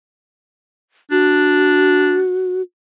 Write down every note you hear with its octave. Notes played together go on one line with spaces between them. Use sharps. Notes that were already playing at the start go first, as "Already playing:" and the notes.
D4 F#4